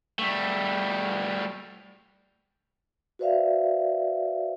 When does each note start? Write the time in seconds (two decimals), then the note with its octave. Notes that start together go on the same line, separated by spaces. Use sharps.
0.19 G3 A3
3.19 F#4 B4 C5 D5 E5 F5